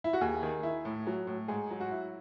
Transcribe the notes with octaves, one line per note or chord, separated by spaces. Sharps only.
E4
F#4
D#2 G#4
D#3
E4
A2
F#3
A2
G#2 G#4
F#3
F#4
E4